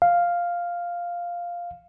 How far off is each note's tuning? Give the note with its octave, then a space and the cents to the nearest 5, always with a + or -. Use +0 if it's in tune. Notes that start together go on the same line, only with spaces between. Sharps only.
F5 +0